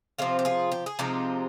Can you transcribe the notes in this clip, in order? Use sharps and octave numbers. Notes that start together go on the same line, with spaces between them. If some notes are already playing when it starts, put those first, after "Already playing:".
C3 F3 G#3 C4 F4
G4
F4 G#4
G4
G#4
C3 F3 G#3 C4 D#4 G4